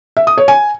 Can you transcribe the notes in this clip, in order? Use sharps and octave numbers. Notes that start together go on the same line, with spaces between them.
E5
D#6
C#5
G#5